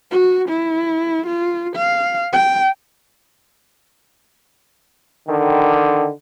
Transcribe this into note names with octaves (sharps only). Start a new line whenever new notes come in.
F#4
E4
F4
F5
G5
D3 D#3